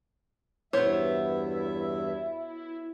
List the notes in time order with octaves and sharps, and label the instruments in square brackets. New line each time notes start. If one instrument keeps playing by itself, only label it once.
[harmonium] E2 G2 E5 [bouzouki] F#3 B3 [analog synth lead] E4 [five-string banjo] C5 C#5